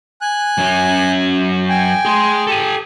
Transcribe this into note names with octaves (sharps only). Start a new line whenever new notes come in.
G#5 F#6
F#2 C#4
G5 G#5
G#4 C6
G4 A4 G#5